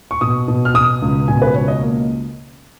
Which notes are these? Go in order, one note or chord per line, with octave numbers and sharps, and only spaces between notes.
C#6
B2 D#6
B2
F6
B2 D#6
C#2
B2 G#5
B4
C#2 C#5
D#5
A#3